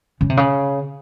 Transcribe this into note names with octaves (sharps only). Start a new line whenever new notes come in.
C#3
C3
C#3